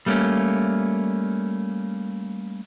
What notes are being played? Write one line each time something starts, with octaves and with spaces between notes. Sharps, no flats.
G3 A3 A#3 C#4